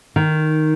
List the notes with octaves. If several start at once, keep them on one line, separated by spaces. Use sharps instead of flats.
D#3